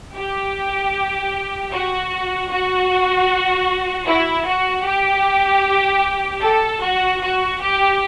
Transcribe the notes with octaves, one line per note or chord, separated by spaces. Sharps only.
G4
F#4
F#4
E4
F#4
G4
A4
F#4
F#4
G4